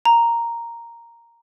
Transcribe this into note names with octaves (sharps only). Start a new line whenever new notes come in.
A#5